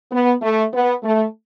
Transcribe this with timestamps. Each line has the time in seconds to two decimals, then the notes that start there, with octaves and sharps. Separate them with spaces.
0.12 B3
0.42 A3
0.73 B3
1.03 A3